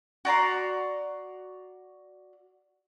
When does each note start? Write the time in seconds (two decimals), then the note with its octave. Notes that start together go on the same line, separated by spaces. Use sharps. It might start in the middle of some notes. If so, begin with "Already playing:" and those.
0.25 F#4 D5 A#5 C6